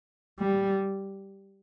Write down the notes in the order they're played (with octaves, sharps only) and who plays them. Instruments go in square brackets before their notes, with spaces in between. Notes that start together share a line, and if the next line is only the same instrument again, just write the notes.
[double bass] G3